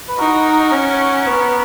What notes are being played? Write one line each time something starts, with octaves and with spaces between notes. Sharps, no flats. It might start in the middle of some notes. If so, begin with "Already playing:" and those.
B4
D#4 F#4 A#4
C#4
B3